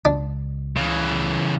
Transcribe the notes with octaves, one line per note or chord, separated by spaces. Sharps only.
C#2 D4
C#3 E3